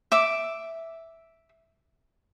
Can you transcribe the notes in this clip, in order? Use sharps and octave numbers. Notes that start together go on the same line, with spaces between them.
E5 D6